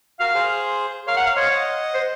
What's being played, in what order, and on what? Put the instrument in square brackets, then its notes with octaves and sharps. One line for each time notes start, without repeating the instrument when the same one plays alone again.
[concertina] F#4 A#4 [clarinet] F5
[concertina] G#4 C5
[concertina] A#4 C#5 [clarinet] F5
[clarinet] F#5
F5
[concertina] C5 D#5 [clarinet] C#5
[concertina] F5
D#5 F#5
[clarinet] C5